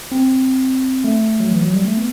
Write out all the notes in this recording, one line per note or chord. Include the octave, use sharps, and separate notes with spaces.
C4
A3
F#3
E3
F#3
G3
A3
B3